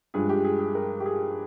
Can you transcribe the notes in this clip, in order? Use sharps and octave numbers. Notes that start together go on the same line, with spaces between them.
G2 F3 G#3 G#4
G4
G#4
G#4
A#4
G4
G#4